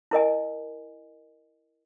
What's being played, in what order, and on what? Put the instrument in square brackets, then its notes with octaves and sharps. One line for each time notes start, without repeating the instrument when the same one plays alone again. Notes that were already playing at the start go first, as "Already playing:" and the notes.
[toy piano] E4 A#4 D#5 G#5